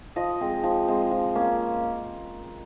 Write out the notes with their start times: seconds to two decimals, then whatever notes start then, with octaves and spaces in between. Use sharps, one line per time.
0.16 F3 D#5
0.41 G#3 C4
0.64 F3
0.88 G#3 C4
1.11 F3
1.35 A#3 C#4